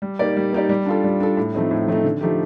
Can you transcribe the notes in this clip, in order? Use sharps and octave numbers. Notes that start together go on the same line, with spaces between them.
G3
A#3 D#4 G4 D5
G3
A#3 D#4 G4 D5
G3
D4 F4 A4
G3
D4 F4 A4
A2
F3 A3 C4 D#4
A2
F3 A3 C4 D#4
D3
F3 A3 D#4 G4